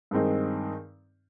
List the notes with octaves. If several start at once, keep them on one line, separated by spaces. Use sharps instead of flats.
G2 D#3 G#3 C4 D#4